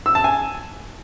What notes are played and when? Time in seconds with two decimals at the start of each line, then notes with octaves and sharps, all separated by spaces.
0.06 E6
0.15 A5
0.24 G#5